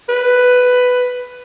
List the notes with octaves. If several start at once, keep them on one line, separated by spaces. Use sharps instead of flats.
B4